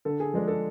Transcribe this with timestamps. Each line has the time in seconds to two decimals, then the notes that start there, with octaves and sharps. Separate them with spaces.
0.05 D3 A4
0.20 G#4
0.33 F3 G#3 D4 A4
0.48 A4